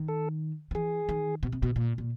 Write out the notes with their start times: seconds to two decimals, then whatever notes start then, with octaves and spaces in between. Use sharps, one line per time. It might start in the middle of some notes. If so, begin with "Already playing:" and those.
Already playing: D#3
0.08 A4
0.71 D#3
0.75 E3 G#4
1.09 D#3
1.43 B2
1.52 C3
1.63 B2
1.76 A#2
1.98 A#2